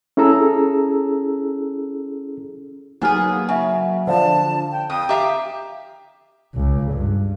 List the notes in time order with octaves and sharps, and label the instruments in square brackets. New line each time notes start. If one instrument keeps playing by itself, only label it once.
[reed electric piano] C#4 E4 G#4 A4 A#5 E6
[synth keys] F#3 A#3 [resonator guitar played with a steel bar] B3 G#4 [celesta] D#4 G#5 F6
[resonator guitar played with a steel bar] C#3 [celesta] E5 F#5 G#5
[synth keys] D3 F3 [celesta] C5 D5 F5 [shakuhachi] A5
[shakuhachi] G5
[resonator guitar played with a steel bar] F2 [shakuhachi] G5 [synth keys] D#6
[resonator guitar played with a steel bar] G4 E5 F5 [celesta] A#5
[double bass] C#2
G2